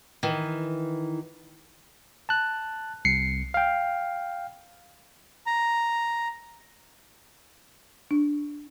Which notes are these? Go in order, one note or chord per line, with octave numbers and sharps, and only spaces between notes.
D#3 E3
A5 F#6
C2 C7 C#7
F5 G5
A#5
D4